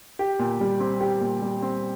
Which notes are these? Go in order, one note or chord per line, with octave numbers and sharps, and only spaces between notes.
G4
A#2
G3
C4
G4
A#2
G3
C4